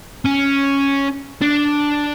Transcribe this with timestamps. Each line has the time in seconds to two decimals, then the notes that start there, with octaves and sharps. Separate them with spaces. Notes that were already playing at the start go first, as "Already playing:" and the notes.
0.25 C#4
1.42 D4